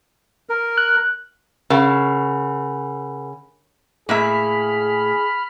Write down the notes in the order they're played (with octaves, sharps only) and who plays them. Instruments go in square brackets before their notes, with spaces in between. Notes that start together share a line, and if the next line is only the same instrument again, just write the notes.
[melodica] A#4
[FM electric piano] F#6
[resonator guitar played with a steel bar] C#3 [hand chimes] A#4 F#5 B5
[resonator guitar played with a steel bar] A2 A#3 E5 [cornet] G#4 [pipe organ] B5 F6